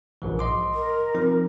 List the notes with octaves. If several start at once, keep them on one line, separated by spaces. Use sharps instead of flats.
A#1 G#2 E3
D#5 C6 D6
A#4
F3 C4 D#4